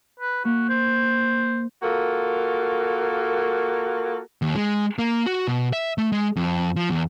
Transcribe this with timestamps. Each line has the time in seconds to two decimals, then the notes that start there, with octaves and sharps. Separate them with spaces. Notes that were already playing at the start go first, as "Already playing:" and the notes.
0.20 B4
0.45 A#3 F#4
0.69 C5
1.83 A#3 F4 F#4 A4 A#4
4.42 D#2
4.56 G#3
4.99 A#3
5.26 F#4
5.47 B2
5.73 E5
5.98 A3
6.12 G#3
6.36 F2
6.76 F3
6.90 E2